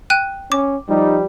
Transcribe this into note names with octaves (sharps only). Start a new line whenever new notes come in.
G5 F#6 D#7
C#4 D6
F3 G3 D#4